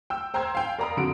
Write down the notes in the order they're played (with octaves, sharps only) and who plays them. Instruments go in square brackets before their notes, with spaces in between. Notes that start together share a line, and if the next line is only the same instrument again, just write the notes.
[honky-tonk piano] G5 E6
C5 G5 A#5 C6 E6 G#6
F5 G5 G#5
A#4 D5 F5 A#5 B5 D#6
F2 D3 F#4 D7